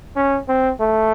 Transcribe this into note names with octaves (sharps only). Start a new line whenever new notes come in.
C#4
C4
A3